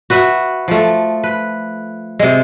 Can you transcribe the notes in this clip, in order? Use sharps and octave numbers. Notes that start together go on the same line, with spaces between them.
F#4 B4 E5 F#5
F3 A3
B4
C3 G#3